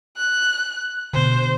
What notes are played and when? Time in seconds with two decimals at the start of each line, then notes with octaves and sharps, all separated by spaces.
0.17 F#6
1.13 B2 D3 C5